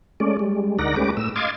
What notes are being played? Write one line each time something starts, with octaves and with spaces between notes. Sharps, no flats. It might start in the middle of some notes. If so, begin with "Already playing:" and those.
G#3 A3 C#4 D5
G3 G#3
D2 D#4 A#4 D5 F#5 A#6
G#3 A3 C#4 G4 B4 D6
A2 E6
D#5 F5 C6 D6 G#6 A6